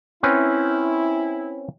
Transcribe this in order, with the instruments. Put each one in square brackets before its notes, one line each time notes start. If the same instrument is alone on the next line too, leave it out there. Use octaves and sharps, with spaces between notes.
[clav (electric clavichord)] C4 C#4 B4 [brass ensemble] E4